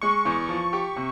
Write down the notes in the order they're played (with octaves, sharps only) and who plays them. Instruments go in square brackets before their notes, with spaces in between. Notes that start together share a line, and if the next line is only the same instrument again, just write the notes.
[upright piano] G#3 [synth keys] C#6
[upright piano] E2
F3
G4
C3